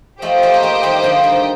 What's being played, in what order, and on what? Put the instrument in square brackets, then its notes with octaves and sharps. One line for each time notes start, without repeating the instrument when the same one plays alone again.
[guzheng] F3 A3 [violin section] G4 C5 D#5 G5
[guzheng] F3 A3
A#3
F3 A3
D#3 G3
D3 F3
D#3 G3